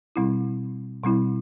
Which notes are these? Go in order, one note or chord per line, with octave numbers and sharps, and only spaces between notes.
B2 G3 C4 E4
B2 G3 C4 E4